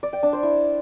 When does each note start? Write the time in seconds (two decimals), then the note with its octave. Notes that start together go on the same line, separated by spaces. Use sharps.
0.03 D5
0.13 G5
0.23 D4
0.33 C5
0.43 E4